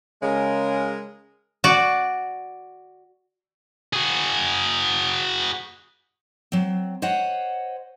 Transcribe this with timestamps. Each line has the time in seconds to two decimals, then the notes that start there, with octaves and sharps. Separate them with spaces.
0.22 C#3 G#3 A#4
1.64 F#4 D5
3.93 F#4 G#4
6.52 F#3 C4
7.02 C5 C#5 D#5 F#5